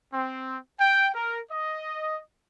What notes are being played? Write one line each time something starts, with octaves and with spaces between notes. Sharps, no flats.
C4
G5
A#4
D#5